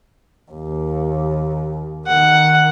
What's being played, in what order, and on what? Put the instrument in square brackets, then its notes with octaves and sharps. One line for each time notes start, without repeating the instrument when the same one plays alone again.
[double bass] D#2
[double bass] D#3 [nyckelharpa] F#5